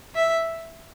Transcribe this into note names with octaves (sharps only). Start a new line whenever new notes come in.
E5